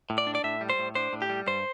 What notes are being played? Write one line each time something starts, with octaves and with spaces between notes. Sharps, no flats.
A2
D5
D4
D5
A2 E5
G3
C5
A2
D4 C5
A2
G4
G3
G2 C5